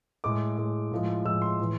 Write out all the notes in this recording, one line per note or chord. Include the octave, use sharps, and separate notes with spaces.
A2 G#3 D6
A2 G#3
A2 F3 G#3
A2 F3 G#3 E6
C6
A2 E3